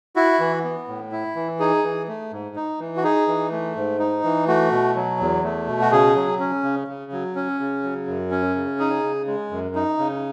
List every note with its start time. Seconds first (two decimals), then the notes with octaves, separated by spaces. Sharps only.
0.16 E4 F#4
0.40 E3
0.64 B3
0.88 A2
1.12 E4
1.36 E3
1.59 D#4 G#4
1.84 E3
2.08 A3
2.32 G#2
2.56 D#4
2.80 E3
2.97 F#4
3.04 D#4 G#4
3.28 E3
3.52 A3
3.76 G#2
3.99 D#4
4.24 E3
4.47 A3 F#4
4.71 B2
4.95 F#3
5.20 E2
5.44 A3
5.67 B2
5.81 F#4
5.91 C#3 G#4
6.15 F#3
6.39 C#4
6.63 C#3
6.88 C#3
7.12 F#3
7.35 C#4
7.60 C#3
7.83 F#3
8.07 F#2
8.31 C#4
8.56 C#3
8.79 D#4 G#4
9.03 C#3
9.27 G#3
9.51 F#2
9.75 D#4
9.99 C#3